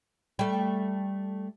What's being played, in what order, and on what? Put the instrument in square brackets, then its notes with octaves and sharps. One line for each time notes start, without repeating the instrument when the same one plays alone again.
[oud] G3 A3